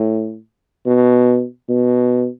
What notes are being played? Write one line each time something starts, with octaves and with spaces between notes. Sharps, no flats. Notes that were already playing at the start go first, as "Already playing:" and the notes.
Already playing: A2
B2
B2